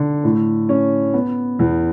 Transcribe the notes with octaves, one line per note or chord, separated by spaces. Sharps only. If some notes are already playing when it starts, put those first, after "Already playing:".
Already playing: D3
A2
C#4
B3
E2